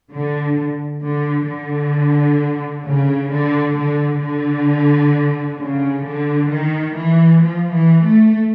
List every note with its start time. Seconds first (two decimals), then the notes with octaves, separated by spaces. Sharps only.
0.11 D3
1.03 D3
1.48 D3
2.84 C#3
3.30 D3
3.76 D3
4.22 D3
5.59 C#3
6.05 D3
6.50 D#3
6.97 E3
7.42 F3
7.72 E3
8.03 A3